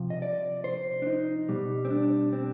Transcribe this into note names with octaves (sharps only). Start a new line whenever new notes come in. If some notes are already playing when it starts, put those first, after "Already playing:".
Already playing: C3 F3
D#5
D5
C5
D4
D#4
B2 G3
C4
D4
C4